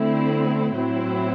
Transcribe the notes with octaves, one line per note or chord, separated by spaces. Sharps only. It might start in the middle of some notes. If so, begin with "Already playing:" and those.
Already playing: D3 A3 C4 E4
A2 F#3 C4 E4